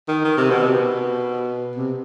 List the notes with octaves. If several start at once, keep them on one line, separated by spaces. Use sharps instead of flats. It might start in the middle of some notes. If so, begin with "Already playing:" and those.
D#3
D#3
C3
B2
C3
B2
C3